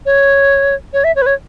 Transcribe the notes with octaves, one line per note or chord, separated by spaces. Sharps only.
C#5
C#5
E5
C#5
B4
C#5